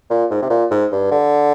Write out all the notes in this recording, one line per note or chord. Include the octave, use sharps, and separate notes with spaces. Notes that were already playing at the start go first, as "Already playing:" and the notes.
A#2
G#2
C3
A#2
G#2
G2
D3